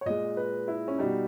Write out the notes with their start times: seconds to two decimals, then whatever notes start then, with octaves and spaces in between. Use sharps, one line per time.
0.01 C#5
0.06 A#2 G#3 D#5
0.37 B4
0.68 E4
0.88 C#4
0.98 B2 G3 D#4